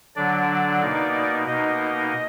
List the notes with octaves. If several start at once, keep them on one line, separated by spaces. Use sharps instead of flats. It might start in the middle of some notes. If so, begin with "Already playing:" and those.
D3 F#3 D4 D5
B2 A#3 D#4
B2 A#3 D#4 D#5